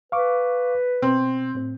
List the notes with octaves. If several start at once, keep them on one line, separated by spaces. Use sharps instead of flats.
B4 F5 C#6 D6
B2 C4
A2 C4